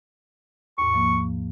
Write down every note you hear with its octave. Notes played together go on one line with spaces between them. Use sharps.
D#2 G#2 C#6
F3 A#3